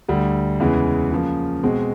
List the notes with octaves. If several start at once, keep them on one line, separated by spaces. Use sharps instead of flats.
D2 D3 G3
E2 C#3 E3 G#3
C#3 F3 A#3
B2 G#3 C4